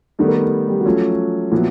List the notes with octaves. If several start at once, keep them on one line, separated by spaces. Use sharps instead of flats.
D#3 G3 A3 B3 A4
A#4
A3 A4
G3 G4
F#4
F3 F#3 A3 C#4 F4
A#2 F3 F#3 B3 E4 F4